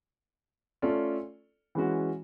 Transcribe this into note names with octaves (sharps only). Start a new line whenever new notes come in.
A3 C#4 F4 A4 D5
E3 G#3 C#4 F#4